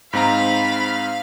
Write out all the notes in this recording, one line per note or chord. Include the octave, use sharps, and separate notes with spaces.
G#2 C4 F5 A#5 B5